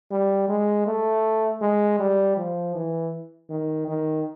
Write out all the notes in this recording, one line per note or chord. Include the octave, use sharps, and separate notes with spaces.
G3
G#3
A3
G#3
G3
F3
E3
D#3
D#3